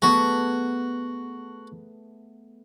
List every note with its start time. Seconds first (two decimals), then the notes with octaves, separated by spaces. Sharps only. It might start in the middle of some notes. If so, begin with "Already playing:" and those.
0.02 A3 B3 F#4 G#4